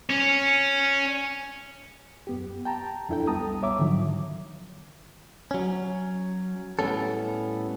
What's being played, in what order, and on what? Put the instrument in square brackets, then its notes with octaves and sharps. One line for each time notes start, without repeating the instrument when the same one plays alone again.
[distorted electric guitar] C#4
[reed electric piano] F#2 B3 G4
G5 A5 A#5
F2 D4 E4 A4 G5
C2 G3 B3 A5 A#5 D#6
C#5 E5 D6
G#2 D3 D#3 F3 F#3
[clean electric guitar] F#3 C#4
A2 G3 B3 C#4 A4